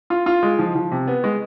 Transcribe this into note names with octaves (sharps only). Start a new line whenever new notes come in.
F4
F4
G#3
F3
F3
C3
B3
G#3